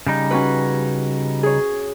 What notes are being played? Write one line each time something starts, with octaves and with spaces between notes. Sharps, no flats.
C#3 G3 D#4
C#4 F#4 B4
G#4 C#5